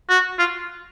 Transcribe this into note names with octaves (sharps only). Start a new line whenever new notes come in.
F#4
F4